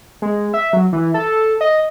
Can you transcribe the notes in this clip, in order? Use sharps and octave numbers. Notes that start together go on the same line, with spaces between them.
G#3
E5
F#3
E3
A4
D#5